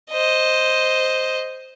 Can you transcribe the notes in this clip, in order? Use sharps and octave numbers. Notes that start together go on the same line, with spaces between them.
C5 D#5